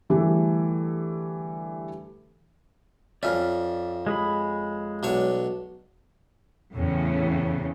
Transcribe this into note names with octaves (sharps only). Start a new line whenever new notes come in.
D3 E3 G3 A3 G#4 A4
F2 C#4 D5 E5 F6
G#3 G#4 B5
B1 D4 C#5
E2 A2 C#3